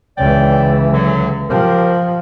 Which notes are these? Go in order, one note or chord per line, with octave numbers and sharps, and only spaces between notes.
C#2 E3 C#4 D5 G5
E2 D3 F#3
F3 G4 A#4 C5